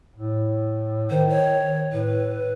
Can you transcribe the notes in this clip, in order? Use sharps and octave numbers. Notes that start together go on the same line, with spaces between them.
A2
D#3 C5
C#5
A2 B4